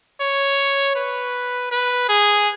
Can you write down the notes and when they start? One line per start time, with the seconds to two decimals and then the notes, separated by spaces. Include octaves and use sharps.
0.20 C#5
0.95 B4
1.71 B4
2.09 G#4